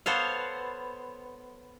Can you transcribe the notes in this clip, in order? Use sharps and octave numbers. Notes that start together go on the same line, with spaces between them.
B3 A4 C5 C#5 F5